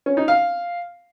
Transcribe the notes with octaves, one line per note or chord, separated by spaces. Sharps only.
C#4
D#4
F5